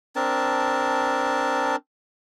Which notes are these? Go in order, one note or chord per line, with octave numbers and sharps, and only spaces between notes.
C4 D4 A#4 A5